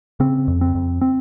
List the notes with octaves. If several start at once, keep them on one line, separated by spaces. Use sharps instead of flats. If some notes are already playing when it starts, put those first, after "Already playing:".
C#3 C4
F2
C4
F2
C4